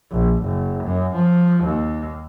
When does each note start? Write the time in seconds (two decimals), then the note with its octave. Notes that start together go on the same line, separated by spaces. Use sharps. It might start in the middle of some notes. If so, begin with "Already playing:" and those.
0.11 A#1
0.44 F#1
0.84 F#2
1.16 F3
1.64 D#2